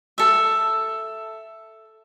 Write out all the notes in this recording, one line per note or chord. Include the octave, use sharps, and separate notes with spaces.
A4 E5